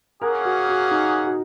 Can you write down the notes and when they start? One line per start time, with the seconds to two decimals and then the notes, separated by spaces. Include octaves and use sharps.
0.22 A#3 C#4 G#4 A#4 F#5
0.45 F#4
0.69 F#4
0.91 D#4
1.27 F#4